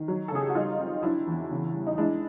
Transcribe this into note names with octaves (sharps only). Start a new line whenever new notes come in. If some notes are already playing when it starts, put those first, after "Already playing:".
Already playing: D#3
F#3
A4
C#3 G#4
G4
F#4
G3 D#4 F4
C4
F#3 D4 E4
E2
C#3
G3
D#4
G#3 D4 E4